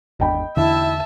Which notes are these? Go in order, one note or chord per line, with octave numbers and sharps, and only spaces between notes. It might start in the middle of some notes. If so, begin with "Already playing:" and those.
G#1 E2 D4 D#5 G5 B5
E2 D3 E4 E5 A5